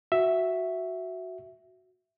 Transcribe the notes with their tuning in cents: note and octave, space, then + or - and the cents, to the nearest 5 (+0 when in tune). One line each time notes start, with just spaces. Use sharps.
F#4 +0 E5 +0